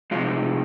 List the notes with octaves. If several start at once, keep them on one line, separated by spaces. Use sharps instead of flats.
C3 F3 G#3 F4